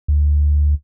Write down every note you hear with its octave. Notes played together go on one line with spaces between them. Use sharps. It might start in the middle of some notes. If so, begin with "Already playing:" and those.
D2